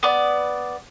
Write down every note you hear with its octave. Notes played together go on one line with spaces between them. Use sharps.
B3 D5